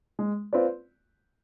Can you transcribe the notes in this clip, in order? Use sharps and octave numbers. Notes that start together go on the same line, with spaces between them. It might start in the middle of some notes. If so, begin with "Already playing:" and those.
G#3
C4 F4 B4 D5